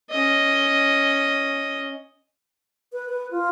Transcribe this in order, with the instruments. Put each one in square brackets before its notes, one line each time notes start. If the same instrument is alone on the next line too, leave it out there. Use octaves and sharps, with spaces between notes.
[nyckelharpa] C#4 D#5
[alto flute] B4
B4
F4